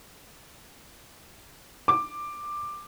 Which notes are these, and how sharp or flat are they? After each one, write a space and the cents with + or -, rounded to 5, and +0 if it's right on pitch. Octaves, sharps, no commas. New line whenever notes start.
D6 +10